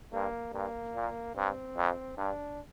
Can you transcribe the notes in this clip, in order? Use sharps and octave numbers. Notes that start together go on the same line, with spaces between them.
G2 A#3
G2 A#3
A#2
G2 C4
F2
G2 D4